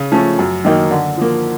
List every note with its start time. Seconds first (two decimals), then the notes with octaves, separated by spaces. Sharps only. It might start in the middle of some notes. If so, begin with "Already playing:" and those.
Already playing: C#3
0.12 F3 A3 C#4
0.39 F#2
0.65 D#3 F#3 A#3 D#4
0.91 D3
1.17 F3 A#3